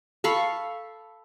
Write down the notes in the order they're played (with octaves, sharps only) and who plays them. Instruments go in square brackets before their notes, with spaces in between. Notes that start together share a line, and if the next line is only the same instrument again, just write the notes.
[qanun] A4 F5 B5 C#6